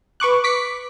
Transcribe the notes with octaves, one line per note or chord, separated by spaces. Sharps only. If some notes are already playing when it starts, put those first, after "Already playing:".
B4 C#6 D6 F#6
D6 B6 C#7